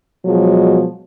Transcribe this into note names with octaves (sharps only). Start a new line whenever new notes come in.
B2 F3 F#3 G#3